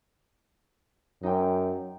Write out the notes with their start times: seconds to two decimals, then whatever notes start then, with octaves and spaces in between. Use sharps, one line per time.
1.23 F#2 D#4 G5